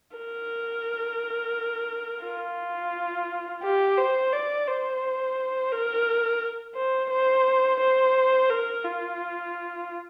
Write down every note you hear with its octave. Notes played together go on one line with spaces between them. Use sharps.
A#4
F4
G4
C5
D5
C5
A#4
C5
C5
C5
A#4
F4